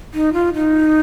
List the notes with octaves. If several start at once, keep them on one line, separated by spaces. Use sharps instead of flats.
D#4
F4
D#4